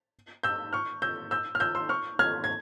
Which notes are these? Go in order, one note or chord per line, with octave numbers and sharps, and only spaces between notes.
E6 G6
C#6 F6
E6 G6
E6 G6
F6
E6 G6
C6 E6
C#6 F6
F6 G#6
G#6